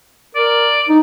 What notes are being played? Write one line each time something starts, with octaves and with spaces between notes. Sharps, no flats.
A#4 D5
D#4